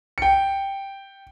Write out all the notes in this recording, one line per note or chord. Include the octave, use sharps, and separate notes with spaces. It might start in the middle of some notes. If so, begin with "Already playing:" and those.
G5 C#7